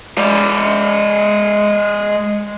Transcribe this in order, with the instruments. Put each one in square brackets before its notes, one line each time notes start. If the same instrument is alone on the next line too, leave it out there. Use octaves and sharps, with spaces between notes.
[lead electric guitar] G#3 D5